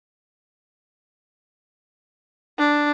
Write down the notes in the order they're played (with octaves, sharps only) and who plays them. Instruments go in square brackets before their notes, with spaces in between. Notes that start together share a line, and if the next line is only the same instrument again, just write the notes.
[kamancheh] D4